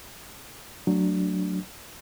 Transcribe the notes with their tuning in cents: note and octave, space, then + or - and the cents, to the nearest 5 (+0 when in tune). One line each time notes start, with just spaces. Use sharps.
F#3 +0 A3 +10 D4 +0